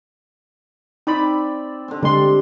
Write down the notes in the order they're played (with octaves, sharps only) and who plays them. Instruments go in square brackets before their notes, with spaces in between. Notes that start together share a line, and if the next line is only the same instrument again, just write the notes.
[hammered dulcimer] C4 D5 [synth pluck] D#4 B5
[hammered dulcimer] D3 C4
[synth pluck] D3 G#3 C6 [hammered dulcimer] G3